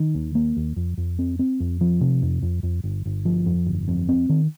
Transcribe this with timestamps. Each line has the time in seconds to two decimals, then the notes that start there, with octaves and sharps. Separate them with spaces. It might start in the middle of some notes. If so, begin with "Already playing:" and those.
Already playing: D#3
0.15 D#2
0.35 A#3
0.56 D#2
0.76 F2
0.98 F2
1.19 C4
1.39 C4
1.60 F2
1.81 F3
2.01 C3
2.22 F2
2.42 F2
2.63 F2
2.84 G1
3.06 G1
3.25 F3
3.46 F2
3.67 G1
3.88 F2
4.09 C4
4.29 D#3